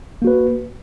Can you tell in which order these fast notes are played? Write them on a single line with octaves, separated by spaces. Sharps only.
A#3 F#4 B4